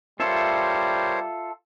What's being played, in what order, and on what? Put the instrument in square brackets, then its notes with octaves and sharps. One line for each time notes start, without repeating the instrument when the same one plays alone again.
[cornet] G3 [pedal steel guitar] F4 A4 E5 [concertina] A#4 C5 C#5